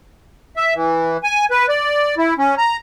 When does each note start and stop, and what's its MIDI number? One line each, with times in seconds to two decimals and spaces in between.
0.57 0.74 76
0.74 1.17 52
1.24 1.45 80
1.51 1.66 71
1.69 2.15 74
2.18 2.34 64
2.38 2.55 61
2.58 2.77 82